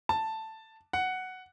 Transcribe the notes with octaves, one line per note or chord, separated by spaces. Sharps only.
A5
F#5